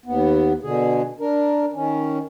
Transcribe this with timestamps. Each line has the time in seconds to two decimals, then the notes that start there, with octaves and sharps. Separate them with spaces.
0.06 D#2 B3
0.63 B2 D3 G#4
1.20 D4 A#4
1.73 D#3 C#4